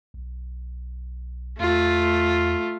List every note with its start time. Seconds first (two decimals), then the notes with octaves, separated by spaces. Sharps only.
0.14 B1
1.60 E2 A3 F4